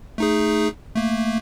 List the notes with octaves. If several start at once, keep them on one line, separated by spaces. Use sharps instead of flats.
A3 D#4 G#4
A3 A#3